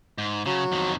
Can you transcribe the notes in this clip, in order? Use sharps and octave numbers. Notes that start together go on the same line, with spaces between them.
G#2
C#3 F#3
F2 D#3